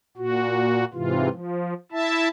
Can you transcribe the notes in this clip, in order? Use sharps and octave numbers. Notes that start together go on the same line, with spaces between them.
A#2 F#4
G#2 C3 E3 F4
F3
E4 E5 A5